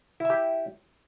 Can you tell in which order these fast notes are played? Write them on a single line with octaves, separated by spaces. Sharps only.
E4 E5 G4